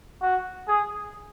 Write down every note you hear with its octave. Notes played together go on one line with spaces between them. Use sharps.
F#4
G#4